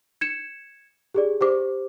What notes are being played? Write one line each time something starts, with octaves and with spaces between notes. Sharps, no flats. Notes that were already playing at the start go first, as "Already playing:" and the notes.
G#6 C#7 E7
G4 G#4 D5
G4 C5 D6